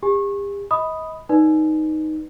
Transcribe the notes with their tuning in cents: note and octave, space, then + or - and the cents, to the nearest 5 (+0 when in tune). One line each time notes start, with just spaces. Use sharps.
G4 +40 G#5 +0
D#5 +35 B5 +0 D#6 +0
D#4 +0 B4 +0 D5 +0